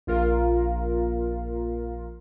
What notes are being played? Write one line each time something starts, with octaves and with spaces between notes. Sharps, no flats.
A#1 F4 A#4 F5